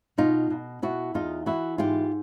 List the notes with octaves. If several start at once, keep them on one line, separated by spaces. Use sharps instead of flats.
B2 D#4 F4
B2
B2 E4 F#4
E2 D#4 F4
E3 E4 F#4
G#2 F4 G4